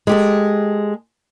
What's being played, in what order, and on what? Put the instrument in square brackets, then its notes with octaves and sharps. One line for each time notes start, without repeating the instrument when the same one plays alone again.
[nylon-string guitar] G#3 G4 A4